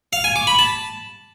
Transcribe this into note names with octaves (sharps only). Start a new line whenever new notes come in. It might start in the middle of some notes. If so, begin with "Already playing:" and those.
F5
G#5
D6
B5
A5